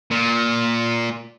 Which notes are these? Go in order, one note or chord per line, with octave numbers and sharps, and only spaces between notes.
A#2